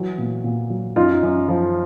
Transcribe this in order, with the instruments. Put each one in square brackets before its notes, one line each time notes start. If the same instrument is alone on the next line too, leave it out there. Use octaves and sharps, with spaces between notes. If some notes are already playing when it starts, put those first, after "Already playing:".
Already playing: [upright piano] E3 F#3
A#2
A#2
F#3
F#2 D#4 F4
F#2
F3